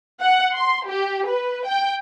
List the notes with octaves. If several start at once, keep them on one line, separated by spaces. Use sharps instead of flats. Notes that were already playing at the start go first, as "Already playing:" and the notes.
F#5
C6
G4
B4
G5